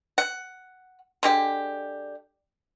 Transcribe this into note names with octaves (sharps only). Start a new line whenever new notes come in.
F#5
D3 G#3 G4